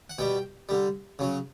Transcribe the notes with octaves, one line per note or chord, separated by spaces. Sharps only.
F#5
B2 G3 G5
D3 G3
C#3 F#3